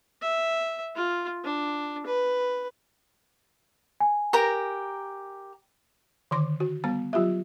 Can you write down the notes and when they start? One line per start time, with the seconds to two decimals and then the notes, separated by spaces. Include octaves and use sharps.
0.22 E5
0.96 F4
1.44 D4
2.06 B4
4.00 G#5
4.33 G4 A#4 A#5
6.31 D3 D#3 C6 D6
6.60 F#4
6.84 G3 B3 A#5
7.13 F#3 F4 G4 E5